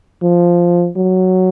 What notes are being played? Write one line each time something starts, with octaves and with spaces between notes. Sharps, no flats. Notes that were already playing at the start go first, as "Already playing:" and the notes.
F3
F#3